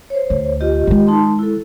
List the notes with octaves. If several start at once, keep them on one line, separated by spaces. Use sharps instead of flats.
C5 C#5
D2
F4 G4 D#5
D#3 G#3
D#4 A5 C6
E4 A4